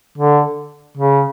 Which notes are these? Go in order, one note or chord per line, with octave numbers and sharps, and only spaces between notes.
D3
C#3